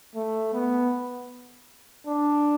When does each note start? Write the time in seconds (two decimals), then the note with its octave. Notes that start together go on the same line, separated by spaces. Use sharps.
0.15 A3
0.54 B3
2.07 D4